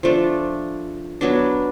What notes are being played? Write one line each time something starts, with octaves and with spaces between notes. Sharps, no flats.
F3 A3 D4
F#3 B3 D4